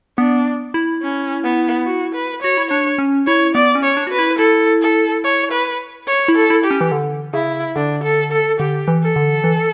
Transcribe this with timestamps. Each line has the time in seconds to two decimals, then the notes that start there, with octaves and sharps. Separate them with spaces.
0.18 B3 D4
0.74 E4
1.02 C#4
1.44 B3
1.86 F#4
2.14 B4
2.42 F#4 C#5
2.57 E4
2.70 D4 C#5
2.98 C#4
3.27 E4 C#5
3.55 B3 D5
3.75 C#4
3.83 C#5
3.97 D4
4.07 F#4 B4
4.19 E4
4.38 E4 A4
4.82 A4
5.24 C#5
5.52 B4
6.07 C#5
6.28 E4
6.35 A4
6.50 E4
6.64 G4
6.71 C#4
6.81 E3
6.92 D3
7.34 C#3 E4
7.76 D3 D4
8.03 A4
8.32 A4
8.60 D3 G4
8.88 E3
9.03 A4
9.16 D3
9.44 E3